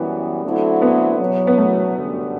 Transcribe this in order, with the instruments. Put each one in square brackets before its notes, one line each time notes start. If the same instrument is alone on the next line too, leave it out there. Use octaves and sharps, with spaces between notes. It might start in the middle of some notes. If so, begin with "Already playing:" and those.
Already playing: [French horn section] F#2 E3 G3 [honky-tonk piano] B3
[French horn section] D3 F#3 A3 C4 E4
[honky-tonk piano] B3
[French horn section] E2 B2 F#3
[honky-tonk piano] B3
A3
[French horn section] F#2 D3 G3